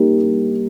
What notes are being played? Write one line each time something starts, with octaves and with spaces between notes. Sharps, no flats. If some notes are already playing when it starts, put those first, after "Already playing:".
Already playing: G3 A#3 D#4 G4 A#4
G3